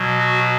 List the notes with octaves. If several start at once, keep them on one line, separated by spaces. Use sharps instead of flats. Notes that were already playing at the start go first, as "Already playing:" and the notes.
Already playing: B2 F#3
F#4